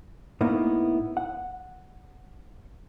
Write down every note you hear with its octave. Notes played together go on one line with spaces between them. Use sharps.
A2 A#3 B3 D#4 E4
F#5